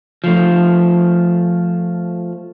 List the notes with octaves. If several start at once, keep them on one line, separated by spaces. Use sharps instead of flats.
F3 A3